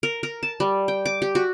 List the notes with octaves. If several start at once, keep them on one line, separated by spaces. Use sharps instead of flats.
A#4
A#4
A5
G3
G5
D6
G4
F#4